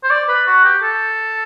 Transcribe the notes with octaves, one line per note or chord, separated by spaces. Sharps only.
C5
D5
B4
F#4
G4
A4